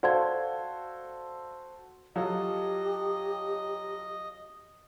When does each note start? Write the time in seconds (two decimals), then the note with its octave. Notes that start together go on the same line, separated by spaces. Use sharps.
0.03 F#4 A4 C5 D5 F5 G#6
2.16 F#3 F4 G4 A4 D#5